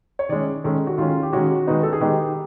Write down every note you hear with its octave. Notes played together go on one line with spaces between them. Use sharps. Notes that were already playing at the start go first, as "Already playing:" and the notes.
C#5
D#3 G#3 C#4 D5
D#3 G#3 C#4 A4
F#4
D#3 G#3 C#4 F4
G4
D#3 G#3 C#4 F#4
D#3 G#3 B3 D#4
A4
G#4
D#3 G#3 B3 D#4 G4